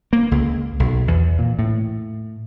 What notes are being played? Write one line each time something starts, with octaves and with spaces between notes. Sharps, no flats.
A#3
C#2
B1
E2
A#2
A2